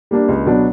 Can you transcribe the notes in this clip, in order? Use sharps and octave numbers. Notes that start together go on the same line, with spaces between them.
G3 A#3 D4
C#2
B2 F#3 B3 D4